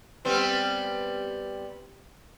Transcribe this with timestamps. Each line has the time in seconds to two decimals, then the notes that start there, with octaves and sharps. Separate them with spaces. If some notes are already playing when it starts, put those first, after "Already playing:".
0.25 G3 B3 C4